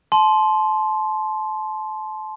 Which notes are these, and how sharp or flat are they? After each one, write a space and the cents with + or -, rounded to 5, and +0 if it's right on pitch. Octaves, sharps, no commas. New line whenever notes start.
A5 -30 C6 +0